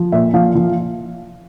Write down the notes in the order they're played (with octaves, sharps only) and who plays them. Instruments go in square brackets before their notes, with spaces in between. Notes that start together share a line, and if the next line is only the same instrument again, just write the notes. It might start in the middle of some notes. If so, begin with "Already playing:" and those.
Already playing: [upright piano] F3
A#2 E5
F3 F5
F3